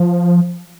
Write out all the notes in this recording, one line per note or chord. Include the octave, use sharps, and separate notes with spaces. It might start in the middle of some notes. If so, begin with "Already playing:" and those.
Already playing: F3